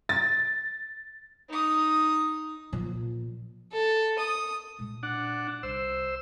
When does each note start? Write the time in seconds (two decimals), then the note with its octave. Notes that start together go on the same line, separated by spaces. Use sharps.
0.09 A6
1.48 D#4 D#6
2.73 A#2 F3
3.72 A4
4.19 D#6
4.79 A#2 G#3
5.03 D4 F#5
5.63 C2 C5 E6